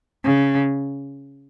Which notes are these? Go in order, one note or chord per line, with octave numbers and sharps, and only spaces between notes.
C#3